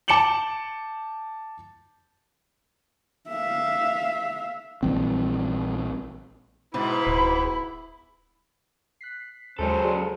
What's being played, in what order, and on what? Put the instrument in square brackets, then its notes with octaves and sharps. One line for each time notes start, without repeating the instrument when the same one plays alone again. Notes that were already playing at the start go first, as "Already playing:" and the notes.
[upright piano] A5 D6 C#7 E7 F#7 G7
[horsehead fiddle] E5 F5
[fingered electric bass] A#1 E3 G3 C4
[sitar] G#2 B2 [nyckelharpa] E4 [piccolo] B5
[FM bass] D1
[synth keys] F#6 B6 C7
[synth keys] D#2 G#3 C#5 [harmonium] C#3 C#4 C5 [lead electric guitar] F#3 A4
[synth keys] F#4 G#4 D5